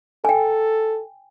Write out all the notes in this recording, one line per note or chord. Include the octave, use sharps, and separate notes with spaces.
A4 G5 G#5